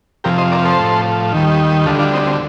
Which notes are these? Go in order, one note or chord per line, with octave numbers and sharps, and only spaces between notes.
F2 C3 F3 G4 A#4
C5 D#5
A#4 D5
A4 C5
A2 F3
D#2 D#3 G3
D2 D3 G3 F4 A4
D4 F4
C4 D#4
C4